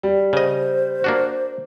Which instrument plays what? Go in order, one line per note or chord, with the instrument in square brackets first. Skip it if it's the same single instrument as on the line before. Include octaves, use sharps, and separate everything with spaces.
[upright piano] G3
[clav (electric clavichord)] C#3 D#5 [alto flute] C5
[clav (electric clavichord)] A#3 D4 F#4